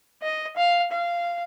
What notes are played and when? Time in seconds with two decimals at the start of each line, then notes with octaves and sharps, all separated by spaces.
0.22 D#5
0.57 F5
0.91 F5